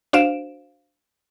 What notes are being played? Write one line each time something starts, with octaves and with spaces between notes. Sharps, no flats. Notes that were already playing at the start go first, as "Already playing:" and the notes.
D4 F#4 C5 F5 D7 E7